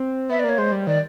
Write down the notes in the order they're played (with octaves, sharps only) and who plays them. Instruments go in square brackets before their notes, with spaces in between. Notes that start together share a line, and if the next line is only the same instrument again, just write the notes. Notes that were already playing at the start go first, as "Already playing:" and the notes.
Already playing: [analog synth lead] C4
[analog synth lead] B3 [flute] E5
[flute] D5
[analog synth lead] A#3 [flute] C#5
[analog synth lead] G#3 [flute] C5
[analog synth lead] G3
[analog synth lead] D#3 [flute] D5